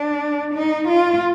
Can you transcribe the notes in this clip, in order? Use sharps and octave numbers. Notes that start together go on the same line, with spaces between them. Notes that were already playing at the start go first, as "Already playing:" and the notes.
Already playing: D4
D#4
F4